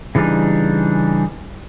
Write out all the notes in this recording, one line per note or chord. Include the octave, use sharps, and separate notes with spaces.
C#3 E3 G3 D4 D#4